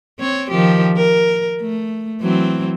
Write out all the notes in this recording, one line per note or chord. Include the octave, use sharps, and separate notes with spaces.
C4 C#5
D#3 F3 G4
A#4
A3
E3 F#3 C4